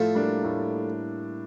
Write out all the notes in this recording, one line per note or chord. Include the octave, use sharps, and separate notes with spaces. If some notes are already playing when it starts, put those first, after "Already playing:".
Already playing: A2 F3 A3
G3 A#3 D4
A2